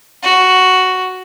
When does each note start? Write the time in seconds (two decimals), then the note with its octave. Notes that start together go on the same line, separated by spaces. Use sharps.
0.23 F#4